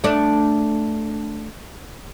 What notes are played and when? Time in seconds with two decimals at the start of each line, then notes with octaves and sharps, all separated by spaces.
0.04 A3 D4